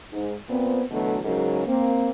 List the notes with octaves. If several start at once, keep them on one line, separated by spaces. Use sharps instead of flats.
G#2
A#2 B3 C4
B2 D3 E3 F#3 A3
G#2 C#3 F#3 A#4
A#3 C4